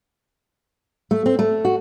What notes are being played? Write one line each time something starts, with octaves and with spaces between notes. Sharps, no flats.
A3
C4
A3
F#4